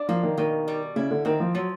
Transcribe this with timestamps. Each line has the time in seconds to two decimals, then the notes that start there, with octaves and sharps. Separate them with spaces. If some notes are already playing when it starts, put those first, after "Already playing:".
Already playing: D4
0.09 F3 A#3
0.23 D#3
0.38 B2 D#3
0.68 G3
0.96 C#3 E4
1.11 D3
1.25 D#3 C4
1.40 F3
1.54 F3 F#3